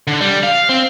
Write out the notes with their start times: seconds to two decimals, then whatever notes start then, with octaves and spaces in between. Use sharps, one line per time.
0.07 D3
0.21 G3
0.43 F5
0.69 C4